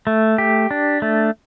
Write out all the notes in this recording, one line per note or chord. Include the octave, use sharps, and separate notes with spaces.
A3
G4
D4
A3